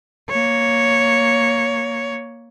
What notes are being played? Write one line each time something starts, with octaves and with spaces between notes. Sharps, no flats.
A#3 C#5